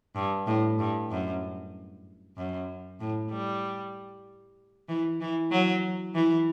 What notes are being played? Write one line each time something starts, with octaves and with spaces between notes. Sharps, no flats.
G2
A2
G2
F#2
F#2
A2
G3
E3
E3
F#3
E3